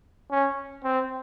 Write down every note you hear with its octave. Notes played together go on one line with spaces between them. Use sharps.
C#4
C4